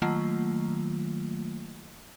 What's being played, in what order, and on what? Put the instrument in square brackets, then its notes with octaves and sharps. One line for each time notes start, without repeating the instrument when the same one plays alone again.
[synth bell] D#3 F#3 A3 A#3 F4